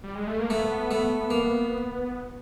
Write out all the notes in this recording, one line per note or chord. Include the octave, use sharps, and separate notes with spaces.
G3
G#3
A3
A#3
A3 B3
A3
A#3